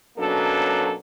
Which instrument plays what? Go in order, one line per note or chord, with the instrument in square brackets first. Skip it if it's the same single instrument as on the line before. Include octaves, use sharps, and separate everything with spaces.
[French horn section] B2 F#3 A#3 C#4 D4 A4